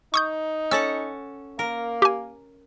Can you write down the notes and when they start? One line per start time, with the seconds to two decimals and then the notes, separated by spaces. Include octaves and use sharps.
0.14 D#4 C#6 D#6 G6
0.71 C#4 A4 F#5 E6
1.59 A#3 A#4
2.02 G4 G#5